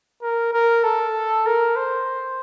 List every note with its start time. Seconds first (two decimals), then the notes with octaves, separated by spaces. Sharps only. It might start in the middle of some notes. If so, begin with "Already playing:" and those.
0.22 A#4
0.53 A#4
0.84 A4
1.46 A#4
1.76 C5